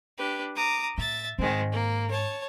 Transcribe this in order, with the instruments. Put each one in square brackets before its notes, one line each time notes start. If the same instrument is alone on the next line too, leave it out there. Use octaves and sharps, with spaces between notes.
[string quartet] D4 G4 B4
A#5 D6 D#6
[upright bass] A2 [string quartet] E5 A6
[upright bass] G#2 [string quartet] D#3 G#3 C4
[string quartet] A#3
C#5 A5